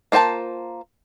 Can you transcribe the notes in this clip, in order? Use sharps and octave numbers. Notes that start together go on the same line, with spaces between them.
A#3 F4 C5 G5 A5